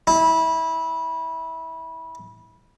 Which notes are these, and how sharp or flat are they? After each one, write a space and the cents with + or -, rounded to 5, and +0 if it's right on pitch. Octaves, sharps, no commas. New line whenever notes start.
E4 -25